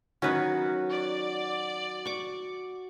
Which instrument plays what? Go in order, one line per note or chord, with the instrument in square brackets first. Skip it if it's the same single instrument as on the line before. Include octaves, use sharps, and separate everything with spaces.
[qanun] D#3 F#3 [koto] C#4 D#4 B4 [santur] F#4
[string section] D5
[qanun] C#6 D6